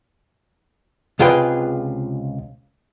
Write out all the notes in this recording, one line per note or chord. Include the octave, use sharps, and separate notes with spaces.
C#2 C3 F4 G#4 B4 G5